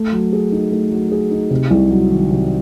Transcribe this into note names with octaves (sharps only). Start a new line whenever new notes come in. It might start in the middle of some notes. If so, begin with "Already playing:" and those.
Already playing: A3
F#3
G#4
D#4
A3
F#3
G#4
D#4
C3
C2
F#3
D#3
C3